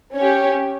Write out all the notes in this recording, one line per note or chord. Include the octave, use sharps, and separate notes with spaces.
C#4 G4 C#5